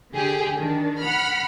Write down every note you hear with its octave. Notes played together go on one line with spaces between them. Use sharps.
D3 G4 G#4
D#3 D4
F#5 B5 F6